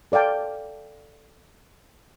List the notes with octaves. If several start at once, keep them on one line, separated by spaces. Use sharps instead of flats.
A4 D5 F5 G5 A5